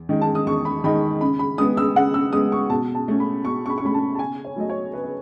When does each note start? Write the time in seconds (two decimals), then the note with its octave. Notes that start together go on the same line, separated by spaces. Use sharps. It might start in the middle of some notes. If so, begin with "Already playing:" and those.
Already playing: E2
0.09 D#3 G#3 D#4
0.21 A5
0.35 D#6
0.47 E2 C#6
0.65 B5
0.84 D#3 G#3 D#4 B5
1.21 C#3 B5
1.39 B5
1.58 G#3 B3 D#6
1.77 E6
1.95 C#3 F#5
2.14 E6
2.33 G#3 B3 D#6
2.52 C#6
2.70 B2 A5
2.95 A5
3.08 A3 C#4
3.20 B5
3.45 B2 C#6
3.66 C#6
3.70 B5
3.78 C#6
3.82 A3 C#4 B5
3.94 A5
4.15 A5
4.19 C#3 G#5
4.45 C#5
4.56 F#3 A3 D#5
4.69 C#5
4.94 C#3 B4
5.04 B4